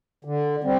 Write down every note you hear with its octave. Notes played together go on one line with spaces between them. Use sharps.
D3
G3 C4